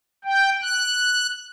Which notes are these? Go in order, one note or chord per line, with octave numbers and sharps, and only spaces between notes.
G5
F#6